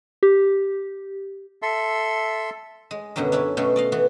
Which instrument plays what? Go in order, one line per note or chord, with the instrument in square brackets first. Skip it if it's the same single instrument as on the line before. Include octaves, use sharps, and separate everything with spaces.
[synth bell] G4
[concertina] A4 E5 C6
[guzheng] G#3
F#2 B2 D3 F#3 G3
C#4 D4 E4 D5
B2 F#3 A3 C#4 F4
D5 D#5 F5
E3 B3 F#4